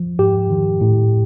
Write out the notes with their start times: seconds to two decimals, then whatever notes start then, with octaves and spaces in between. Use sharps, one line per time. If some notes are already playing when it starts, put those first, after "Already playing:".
Already playing: F3
0.19 G#2 G4
0.50 D#3
0.81 A2